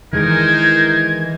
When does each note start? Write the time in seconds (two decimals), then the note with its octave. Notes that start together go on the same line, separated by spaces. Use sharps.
0.13 D#3 E3 G#3 D#4 A#4 C5 G#6